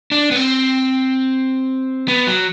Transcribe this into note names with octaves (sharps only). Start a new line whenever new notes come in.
D4
B3
C4
B3
F#3